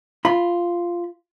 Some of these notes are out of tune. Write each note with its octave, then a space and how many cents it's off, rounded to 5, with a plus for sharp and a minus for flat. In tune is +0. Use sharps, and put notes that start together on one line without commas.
F4 -5 B5 +0